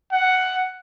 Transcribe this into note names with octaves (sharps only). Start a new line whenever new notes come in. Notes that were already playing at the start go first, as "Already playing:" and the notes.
F#5